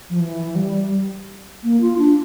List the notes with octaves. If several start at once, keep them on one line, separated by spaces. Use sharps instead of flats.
F3
E3
G3
A#3
F4
D4